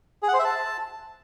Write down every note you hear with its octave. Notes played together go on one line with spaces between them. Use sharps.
G#4
F#5
C5
E5
A5